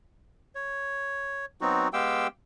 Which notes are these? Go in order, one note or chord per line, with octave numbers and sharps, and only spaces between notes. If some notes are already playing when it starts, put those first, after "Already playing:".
C#5
F#3 B3 C4 D#4 F#4
G#3 B3 G4 F5 G5 E6